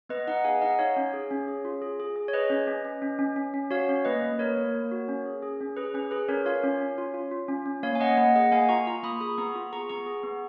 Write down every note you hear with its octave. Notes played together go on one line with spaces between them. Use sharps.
B3 B4 D#5
D#4 D#5 F#5
G#4 F5 G#5
D#4 D#5 F#5
D#4 C#5 F5
C#4
G#4
C#4
G#4
F4
G#4
G#4
G#4
C#5
G#4 B4 D#5
C#4
C#4
C#4
C#4
C#4
C#4
C#4
F#4 C#5 F5
C#4
A#3 B4 D#5
A#3
A#3 A#4 C#5
A#3
A#3
F#4
C#4
G#4
G#4
C#4
G#4 B4
C#4 B4
G#4 B4
C#4 A#4 C#5
F4 C#5 F5
C#4
C#4
F4
F4
F4
C#4
C#4
A#3 C#5 F5
G#5
A#3 D#5 F#5
A#3 D#5 F#5
G#4 D#5 F#5
A#3 F5 G#5
F4 A#5 C#6
F4 A#5 C#6
A#3 B5 D#6
G#4 B5 D#6
B3 A#5 C#6
F4
G#4 A#5 C#6
B3 A#5 C#6
G#4
B3